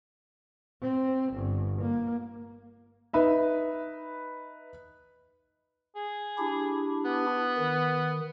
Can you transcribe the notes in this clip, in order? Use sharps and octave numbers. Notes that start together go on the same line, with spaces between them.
C4
G1
A#3
D#4 B4 E5
G#4
D4 E4 G4
B3
D#3